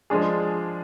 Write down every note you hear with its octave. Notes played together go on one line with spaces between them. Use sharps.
F3 G#3 D4 G#4